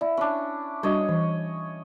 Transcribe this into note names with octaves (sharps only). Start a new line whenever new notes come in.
E4 D5
C#4 D4
G3 D4 F#4 C#5 D#5
E3